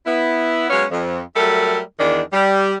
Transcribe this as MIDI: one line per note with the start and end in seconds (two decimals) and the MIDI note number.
0.06 0.66 59
0.06 0.66 64
0.69 0.84 54
0.69 0.84 56
0.69 0.84 59
0.69 0.84 61
0.69 0.84 73
0.69 0.84 77
0.90 1.19 41
1.36 1.79 54
1.36 1.79 55
1.36 1.79 57
1.36 1.79 69
1.36 1.79 70
1.36 1.79 76
1.98 2.21 40
1.98 2.21 51
1.98 2.21 62
2.32 2.73 55